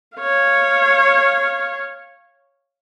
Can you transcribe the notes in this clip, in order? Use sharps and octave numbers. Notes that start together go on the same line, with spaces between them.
C#5 F5